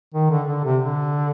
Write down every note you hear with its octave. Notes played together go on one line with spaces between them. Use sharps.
D#3
D3
D3
C3
D3